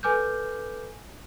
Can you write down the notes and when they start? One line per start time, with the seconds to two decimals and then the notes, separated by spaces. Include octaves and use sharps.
0.03 A4 B4 G#5 D6 F6 G6